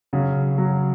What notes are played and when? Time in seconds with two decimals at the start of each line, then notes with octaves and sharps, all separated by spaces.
0.13 C#3 F#3
0.58 F#3